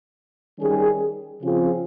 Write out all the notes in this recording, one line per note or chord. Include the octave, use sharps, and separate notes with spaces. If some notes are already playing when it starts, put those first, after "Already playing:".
D#3 G3 C#4 G#4
C#3 F3 C4 F4 G#4